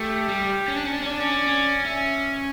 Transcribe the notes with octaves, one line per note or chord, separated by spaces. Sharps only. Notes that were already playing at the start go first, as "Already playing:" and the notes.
Already playing: A3 G4
G3
C#4
D4
C#4
D4
C#4
D4 D5
C#4
C#4
C#4 E5